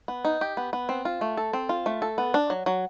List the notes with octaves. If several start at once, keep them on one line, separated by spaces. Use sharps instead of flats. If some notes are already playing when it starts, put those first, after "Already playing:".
B3
D#4
G4
B3
B3
C4
F4
A3
A4
C4
F4
A3
A4
B3
D4
F#3
F#3